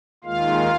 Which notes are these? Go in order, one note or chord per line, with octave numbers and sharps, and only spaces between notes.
D#2 D#3 G#3 F4 F5